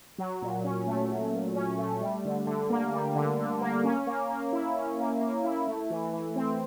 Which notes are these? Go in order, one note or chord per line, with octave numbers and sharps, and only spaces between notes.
F#3
A#2
C#4
A3
F#3
A#2
C#4
A3
G3
D3
D3
A#3
G3
D3
D3
A#3
C#4
A#3
A#3
E4
C#4
A#3
A#3
E4
A3
E3
E3
C4